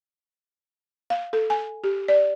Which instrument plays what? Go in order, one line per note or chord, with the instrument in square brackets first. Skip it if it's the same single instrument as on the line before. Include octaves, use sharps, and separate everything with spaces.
[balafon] F5
A4
G#5
G4
D5